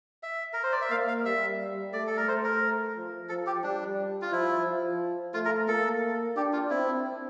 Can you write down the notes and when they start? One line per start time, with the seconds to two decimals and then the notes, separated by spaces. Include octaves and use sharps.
0.23 E5
0.53 A#4
0.63 C5
0.72 D5
0.82 E5
0.91 A#3 F5
1.08 F5
1.25 G3 E5
1.93 A3 D5
2.07 A4
2.17 A#4
2.27 A3 C5
2.44 A#4
2.96 F3
3.29 F3 A4
3.47 G4
3.64 G3 D4
4.22 F4
4.32 F3 E4
4.65 F3
5.34 A3 F4
5.45 A#4
5.68 A#3 A4
6.36 D4 G4
6.53 F4
6.70 C4 E4